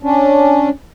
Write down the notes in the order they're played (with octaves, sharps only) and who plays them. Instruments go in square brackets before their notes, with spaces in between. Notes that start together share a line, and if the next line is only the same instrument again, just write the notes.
[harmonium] C#4 D4